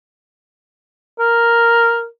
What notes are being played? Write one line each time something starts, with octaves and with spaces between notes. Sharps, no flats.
A#4